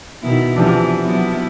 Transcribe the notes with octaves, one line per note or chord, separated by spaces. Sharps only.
B2 D#3 E4
C3 E3 F3 B3 D4
F#3 B3 E4